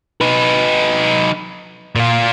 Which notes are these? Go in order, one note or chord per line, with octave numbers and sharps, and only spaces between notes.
D#4 B4
A#2 F4